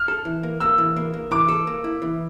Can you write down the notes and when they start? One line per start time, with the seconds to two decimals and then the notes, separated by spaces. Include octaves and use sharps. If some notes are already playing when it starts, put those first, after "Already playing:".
Already playing: F6
0.08 A4
0.25 E3
0.43 A#3
0.60 A#3 E6
0.78 E3
0.96 A#3
1.14 A#3
1.31 E3 D6
1.48 A4
1.67 A#3
1.84 E4
2.02 E3